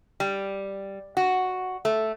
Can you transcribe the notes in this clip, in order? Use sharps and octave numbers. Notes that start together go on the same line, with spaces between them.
G3
F#4
A3